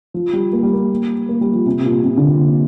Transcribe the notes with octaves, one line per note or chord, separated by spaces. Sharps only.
F3
G3
A#3
G3
A#3
A#3
G3
F3
C3
C3
A#2
C3
D3